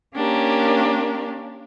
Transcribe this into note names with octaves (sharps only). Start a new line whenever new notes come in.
A#3 C#4 D4 G4 A#4